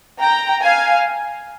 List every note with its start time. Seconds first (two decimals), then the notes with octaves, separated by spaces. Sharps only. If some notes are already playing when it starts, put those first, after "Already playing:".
0.21 G5 A#5
0.63 F5 G#5